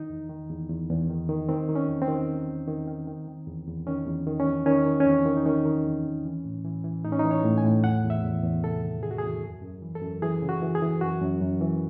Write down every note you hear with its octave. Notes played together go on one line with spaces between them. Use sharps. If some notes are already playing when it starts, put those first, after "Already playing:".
Already playing: D#3 D#4
E2
D#3
E2
E2
E2
D#3
D#3
D#3 C4
D#3
C#4
E2
C4
D#3
D#3
E2
D#3
D#3
D#3
D#3
E2
E2
D#3 C#4
E2
D#3
C#4
E2
D#3 C#4
D#3
C#4
E2 C4
D#3
D#4
D#3 C#4
D#3
E2
E2
E3
A2
E3
E3
A2 D#4
C#4
D#4
E3
C#5
A2
G#5
A2
E2 F#5
E2
E5
E2
E2
C3 A4
D#3
E2 G#4
F#4
E2 G#4
F#2
F#2
E3
A4
F#2
E3 G#4
C#3
F#4
E3
G#4
E3
F#2 F#4
F#2
F#2
E3